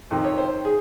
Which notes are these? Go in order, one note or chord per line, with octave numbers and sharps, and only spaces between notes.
F2 C3 D#3
C#5
C5
G#4